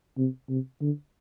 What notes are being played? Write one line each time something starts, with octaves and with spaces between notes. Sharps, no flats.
C3
C3
D3